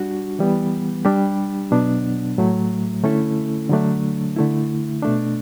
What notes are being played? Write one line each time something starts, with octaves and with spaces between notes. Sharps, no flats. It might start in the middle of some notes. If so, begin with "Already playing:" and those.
Already playing: G3 D4 F#4
E3 G3 B3
G3 D4 G4
B2 F#3 B3 D4
A2 F#3 A3
D3 A3 C#4 E4 A4
D3 F#3 A3 D4
D3 A3 E4
B2 A3 D4